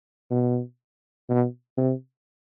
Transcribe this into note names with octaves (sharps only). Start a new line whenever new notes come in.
B2
B2
C3